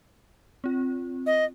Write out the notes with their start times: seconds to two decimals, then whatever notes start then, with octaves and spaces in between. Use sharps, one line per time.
0.64 C4 F4
1.26 D#5